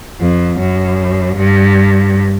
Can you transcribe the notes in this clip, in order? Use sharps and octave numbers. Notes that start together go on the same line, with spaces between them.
F2
F#2
G2